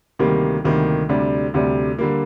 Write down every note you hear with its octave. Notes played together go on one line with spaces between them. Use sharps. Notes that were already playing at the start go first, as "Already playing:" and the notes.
D2 C3 D#3 G3 A#3
D2 C3 D#3 G3 A#3
D2 C3 G3 D4
D2 C3 G3 D4
D3 G3 A#3